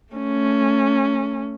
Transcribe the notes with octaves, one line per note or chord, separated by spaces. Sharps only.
A3 C#4